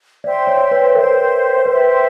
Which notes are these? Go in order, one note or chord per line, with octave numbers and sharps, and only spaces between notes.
C5 D5 E5 G5 C6
C#5
B4
A#4 C5 E5 G5 C6
B4 C5 E5 G5 C6